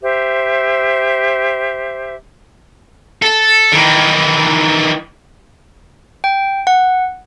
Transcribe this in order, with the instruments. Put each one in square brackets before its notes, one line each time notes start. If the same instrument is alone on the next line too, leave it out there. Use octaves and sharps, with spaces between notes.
[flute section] G4 C5 E5
[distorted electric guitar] A4
D#3 E3
[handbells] G5
F#5